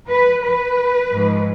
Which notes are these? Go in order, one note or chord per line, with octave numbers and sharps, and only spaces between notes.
B4
B4
G#2 F3 G#3